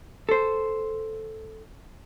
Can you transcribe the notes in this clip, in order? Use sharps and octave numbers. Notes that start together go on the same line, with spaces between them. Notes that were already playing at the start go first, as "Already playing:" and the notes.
A4 C5